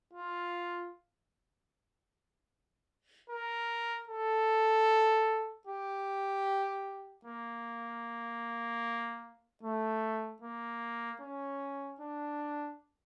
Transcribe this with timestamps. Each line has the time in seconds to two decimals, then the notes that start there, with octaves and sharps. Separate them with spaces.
0.14 F4
3.30 A#4
4.09 A4
5.67 G4
7.25 A#3
9.63 A3
10.42 A#3
11.21 C#4
12.01 D4